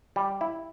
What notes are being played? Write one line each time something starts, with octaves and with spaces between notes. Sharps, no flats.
G3
E4